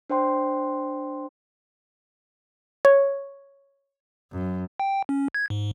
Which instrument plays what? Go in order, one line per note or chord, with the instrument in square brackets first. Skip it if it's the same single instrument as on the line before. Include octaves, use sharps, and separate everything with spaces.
[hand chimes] D4 C5 G5 C6
[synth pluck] C#5
[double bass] F#2
[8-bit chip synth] G5
C#4
G#6
G#2